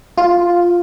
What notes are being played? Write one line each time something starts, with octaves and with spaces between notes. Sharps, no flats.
F4